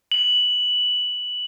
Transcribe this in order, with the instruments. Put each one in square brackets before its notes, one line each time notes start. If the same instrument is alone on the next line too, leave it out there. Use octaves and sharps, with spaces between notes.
[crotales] F#7